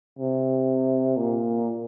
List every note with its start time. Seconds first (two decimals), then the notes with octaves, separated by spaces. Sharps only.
0.19 C3
1.17 A#2